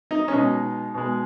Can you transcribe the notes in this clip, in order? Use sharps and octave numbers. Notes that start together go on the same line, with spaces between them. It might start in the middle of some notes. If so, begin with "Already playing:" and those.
D#4
C#4
B2 G#3 D#4
B2 G#3